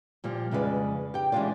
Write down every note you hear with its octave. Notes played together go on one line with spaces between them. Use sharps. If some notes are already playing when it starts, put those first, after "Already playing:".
A#2 F3 G3
F2 C#3 G#3 E4 B4 D5
G4 G5
E3 G#3 C#4 D4 F4 D5